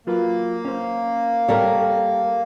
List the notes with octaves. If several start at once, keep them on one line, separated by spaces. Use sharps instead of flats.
F#3 A#3 F4 B4
C#4 C5
G3 A4 A#4 C#5